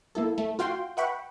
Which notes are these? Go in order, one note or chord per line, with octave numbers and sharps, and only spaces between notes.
A#3 E4 A4
A3
F4 F#4 F5 G5 C6
B4 E5 F#5 G5 B5 C#6